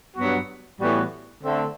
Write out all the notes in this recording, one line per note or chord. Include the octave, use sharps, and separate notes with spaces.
G2 F#3 B3 F#4
A2 E3 G3 B3 F#4
D3 A3 C4